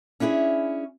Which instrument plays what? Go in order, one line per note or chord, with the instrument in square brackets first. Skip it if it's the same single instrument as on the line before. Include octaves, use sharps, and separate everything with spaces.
[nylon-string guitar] C#4 D4 E4 F#4 G#4